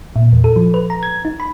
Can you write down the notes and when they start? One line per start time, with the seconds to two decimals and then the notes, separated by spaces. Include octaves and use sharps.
0.16 A#2
0.33 E2
0.44 A4
0.56 F3
0.74 B4
0.90 A#5
1.03 G#6
1.25 D#4
1.40 B5